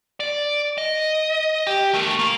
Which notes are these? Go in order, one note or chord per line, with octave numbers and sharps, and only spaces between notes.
D5
D#5
G4
A3 A#4
A#3